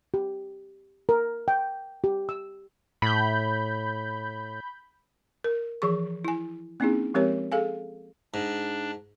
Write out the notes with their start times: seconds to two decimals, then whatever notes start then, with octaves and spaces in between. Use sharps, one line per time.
0.14 G4
1.09 A#4
1.48 G5
2.04 G4
2.29 E6
3.02 A2 B5 G6
5.44 A#4
5.82 E3 F3 G#4 C#6
6.25 E4 G#5
6.80 A#3 C4 C#4 D#4 E4 G#4
7.14 F3 G#3 C4 G4 A#4 C#5
7.52 G#4 A4 F5 G#5
8.34 G#2 D4